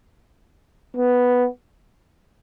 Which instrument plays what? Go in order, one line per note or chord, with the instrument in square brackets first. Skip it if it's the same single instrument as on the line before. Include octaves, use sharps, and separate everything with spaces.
[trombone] B3